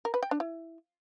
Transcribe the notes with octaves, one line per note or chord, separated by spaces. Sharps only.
A#4
B4
G5
D4
E4